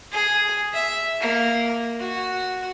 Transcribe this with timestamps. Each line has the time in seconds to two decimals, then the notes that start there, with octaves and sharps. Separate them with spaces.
0.12 G#4
0.73 E5
1.20 A#3
1.99 F#4